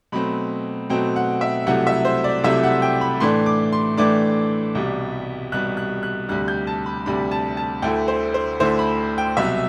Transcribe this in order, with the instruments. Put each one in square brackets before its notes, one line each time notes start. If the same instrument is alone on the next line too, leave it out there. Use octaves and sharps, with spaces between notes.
[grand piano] B2 F#3 A3 C4 B5
B2 F#3 A3 C4 G5
F#5
E5
C2 C3 F#3 A3 E4 F#5
E5
C5
D5
C2 C3 F#3 A3 E4 E5
F#5
G5
B5
A2 E3 A3 D4 C6
D6
C6
A2 E3 A3 D4 D6
C2 B2 G3
C2 B2 G3 F#6
F#6
F#6
D2 C3 G3 D4 F#6
G6
A5
B5
D2 C3 G3 D4 B5
A5
A5
D2 D3 A3 E4 G5
C5
C5
D2 D3 A3 E4 C5
B5
G5
C2 B2 F#3 E5